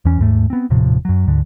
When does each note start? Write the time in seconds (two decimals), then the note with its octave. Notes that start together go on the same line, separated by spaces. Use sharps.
0.05 E2 E3 C#4
0.19 D#2 G#2 A3
0.50 B3 C4
0.70 D#1 A2 C3 F3
1.05 F#2 F#3
1.27 D2 G#2 D3